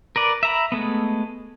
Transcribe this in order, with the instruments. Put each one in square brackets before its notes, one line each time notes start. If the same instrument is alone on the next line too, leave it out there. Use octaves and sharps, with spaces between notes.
[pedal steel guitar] A#4 B4 D5
E5 A#5 B5
G#3 A3 B3